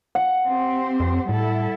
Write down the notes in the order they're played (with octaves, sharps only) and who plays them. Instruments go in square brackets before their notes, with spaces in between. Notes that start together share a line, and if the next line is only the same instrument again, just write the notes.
[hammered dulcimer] F#5
[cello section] C4 G4 C5
[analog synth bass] F2
[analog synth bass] A2 [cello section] G3 E4 A4